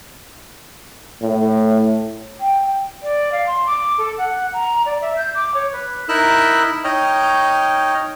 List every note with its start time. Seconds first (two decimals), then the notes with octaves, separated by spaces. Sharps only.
1.22 A2
2.40 G5
3.03 D5
3.32 F5
3.47 C6
3.67 D6
3.98 A4
4.18 F#5
4.53 A#5
4.86 D5
5.01 E5
5.17 G6
5.35 D6
5.54 C#5
5.73 B4
6.09 D#4 E4 A#4 E6 F#6
6.84 D#4 C#5 D#5 G5 F6